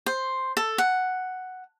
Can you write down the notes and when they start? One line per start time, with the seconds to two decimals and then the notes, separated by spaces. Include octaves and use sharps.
0.06 C5
0.57 A4
0.78 F#5